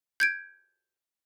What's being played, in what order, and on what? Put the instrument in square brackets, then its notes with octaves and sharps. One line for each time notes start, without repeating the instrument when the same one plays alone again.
[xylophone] G6 G#6 D7